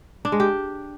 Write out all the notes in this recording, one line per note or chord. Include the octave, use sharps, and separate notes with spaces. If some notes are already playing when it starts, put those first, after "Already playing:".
D4
G#3
G4